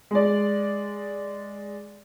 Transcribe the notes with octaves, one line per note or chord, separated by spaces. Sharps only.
G#3 D5